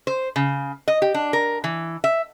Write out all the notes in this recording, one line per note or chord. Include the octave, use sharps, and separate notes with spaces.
C5
C#3
D#5
G4
D4
A#4
E3
E5